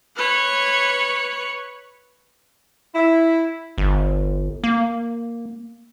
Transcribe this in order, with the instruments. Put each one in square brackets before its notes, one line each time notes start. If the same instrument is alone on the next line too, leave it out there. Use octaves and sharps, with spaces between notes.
[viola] B4 C#5
[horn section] E4
[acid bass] G1
A#3